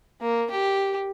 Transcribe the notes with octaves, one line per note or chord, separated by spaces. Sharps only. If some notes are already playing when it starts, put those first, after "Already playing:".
A#3
G4